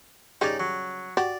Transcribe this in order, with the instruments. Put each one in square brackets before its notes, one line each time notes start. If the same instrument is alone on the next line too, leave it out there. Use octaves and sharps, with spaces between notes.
[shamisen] C#3 G3 C#4 [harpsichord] D#4 D5
[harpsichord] F#3
[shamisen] F#4 G4 [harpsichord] D5